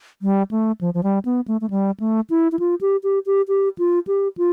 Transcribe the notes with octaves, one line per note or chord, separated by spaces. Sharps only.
G3
A3
F3
F3
G3
B3
A3
A3
G3
A3
E4
E4
F4
G4
G4
G4
G4
F4
G4
F4